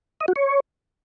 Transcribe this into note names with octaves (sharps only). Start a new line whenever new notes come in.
D#5
F#4
C#5